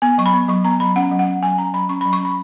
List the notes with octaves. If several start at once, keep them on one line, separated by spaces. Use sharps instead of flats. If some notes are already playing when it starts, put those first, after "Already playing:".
B3 G#5
F#3 C#6
B5
B3
F#3 C#6
B3 A#5
F#3 B5
C#4 F#5
F#3
F#5
C#4
F#3 G#5
C#4 A#5
F#3 B5
C#4 C#6
F#3 B5
C#6
C#4 B5